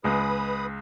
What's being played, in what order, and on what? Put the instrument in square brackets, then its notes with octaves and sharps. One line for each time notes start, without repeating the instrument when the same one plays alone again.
[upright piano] C#2 G#3 [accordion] B4 B5 D#6